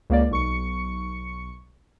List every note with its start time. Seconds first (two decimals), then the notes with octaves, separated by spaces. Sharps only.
0.10 C#2 A#3 D5
0.31 B1 C#6 C#7